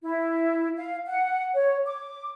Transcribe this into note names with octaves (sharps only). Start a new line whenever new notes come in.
E4
F5
F#5
C#5
D6